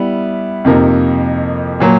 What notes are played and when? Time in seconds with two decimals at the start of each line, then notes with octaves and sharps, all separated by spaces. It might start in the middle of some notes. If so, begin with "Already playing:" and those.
Already playing: G3 B3 E4
0.65 F2 C3 F3 A#3 D#4
1.80 A#2 F#3 A#3